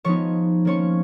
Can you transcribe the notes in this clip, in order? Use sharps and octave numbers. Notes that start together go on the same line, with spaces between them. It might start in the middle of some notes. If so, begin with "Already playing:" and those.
F3 G#3 B3 D#4 C#5 C#6
F3 A#3 C#4 C#5 C#6